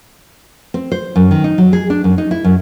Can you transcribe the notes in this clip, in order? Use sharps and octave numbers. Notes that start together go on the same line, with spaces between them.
C4
C5
F#2
D#3
D#4
F#3
G#4
D4
F#2
D#4
E4
F#2